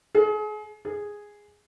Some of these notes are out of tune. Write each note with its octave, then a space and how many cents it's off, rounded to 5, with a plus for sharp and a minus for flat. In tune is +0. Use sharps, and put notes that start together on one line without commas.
G#4 +35
G#4 -5